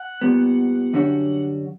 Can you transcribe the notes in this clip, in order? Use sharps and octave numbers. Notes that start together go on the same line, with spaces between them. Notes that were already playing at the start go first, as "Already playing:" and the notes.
Already playing: F#5
A#2 G3 B3
F#2 D3 G3 C#4 F#4